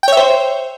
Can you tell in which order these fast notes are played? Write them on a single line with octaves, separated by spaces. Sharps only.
G5 C#5 E5 C5